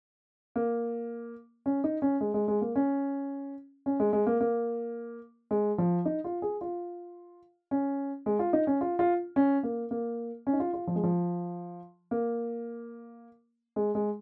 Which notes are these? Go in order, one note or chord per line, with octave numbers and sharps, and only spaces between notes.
A#3
C#4
D#4
C#4
G#3
G#3
G#3
A#3
C#4
C#4
G#3
G#3
A#3
A#3
G#3
F3
D#4
F4
G#4
F4
C#4
G#3
F4
D#4
C#4
F4
F4
C#4
A#3
A#3
C#4
D#4
F4
F4
F3
G#3
F3
A#3
G#3
G#3